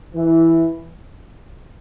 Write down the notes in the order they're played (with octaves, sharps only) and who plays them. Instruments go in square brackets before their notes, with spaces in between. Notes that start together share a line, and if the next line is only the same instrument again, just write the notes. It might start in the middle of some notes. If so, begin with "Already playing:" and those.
[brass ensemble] E3